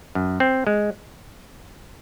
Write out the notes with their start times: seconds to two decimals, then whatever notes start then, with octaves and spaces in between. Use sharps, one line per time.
0.15 F#2
0.40 C4
0.67 G#3